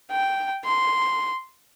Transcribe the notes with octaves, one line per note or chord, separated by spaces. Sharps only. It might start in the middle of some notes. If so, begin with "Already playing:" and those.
G5
C6